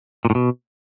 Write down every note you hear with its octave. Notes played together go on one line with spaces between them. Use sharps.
A#2
A2
B2